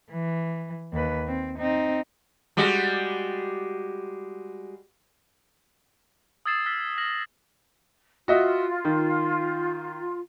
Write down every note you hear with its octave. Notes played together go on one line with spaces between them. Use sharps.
E3
D#2 B4
C4
C4 D#4
G3 G#3 F#4
D#6 E6 G#6 A6 C7 E7
E6 F6 A6 B6
F6 A#6 F#7
F4 F#4 D#5 E5
D#3